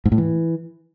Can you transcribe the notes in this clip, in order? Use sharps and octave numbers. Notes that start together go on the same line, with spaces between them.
G#2
A2
E3